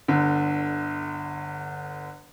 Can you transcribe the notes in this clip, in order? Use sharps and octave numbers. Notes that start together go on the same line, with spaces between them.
G1 D3